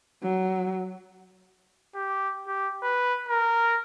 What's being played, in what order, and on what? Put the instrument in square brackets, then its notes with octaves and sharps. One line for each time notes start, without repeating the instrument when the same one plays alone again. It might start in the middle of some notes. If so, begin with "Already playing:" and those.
[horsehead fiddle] F#3
[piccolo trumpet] G4
G4
B4
A#4